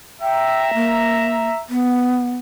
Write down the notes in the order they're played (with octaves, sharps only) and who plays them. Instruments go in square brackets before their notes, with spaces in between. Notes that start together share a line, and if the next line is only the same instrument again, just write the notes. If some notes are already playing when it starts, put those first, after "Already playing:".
[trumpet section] E5 A#5 [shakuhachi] G5
[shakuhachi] A#3
B3